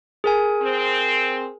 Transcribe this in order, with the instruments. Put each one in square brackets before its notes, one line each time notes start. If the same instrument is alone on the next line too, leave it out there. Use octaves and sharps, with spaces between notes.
[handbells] G#4 A#4 G#5
[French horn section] C4